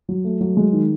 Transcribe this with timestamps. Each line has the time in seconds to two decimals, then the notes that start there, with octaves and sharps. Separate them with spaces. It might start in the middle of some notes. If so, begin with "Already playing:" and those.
0.09 F#3
0.24 A3
0.41 F#3
0.57 G#3
0.73 D#3